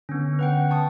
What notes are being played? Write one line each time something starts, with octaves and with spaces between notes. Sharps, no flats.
D3 B3 C#4
B4 F#5 G5
A5 C#6 D#6